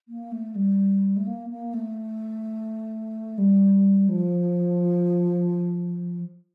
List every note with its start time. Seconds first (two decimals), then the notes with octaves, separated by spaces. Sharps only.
0.08 A#3
0.32 A3
0.55 G3
1.17 A3
1.27 A#3
1.50 A#3
1.73 A3
3.38 G3
4.08 F3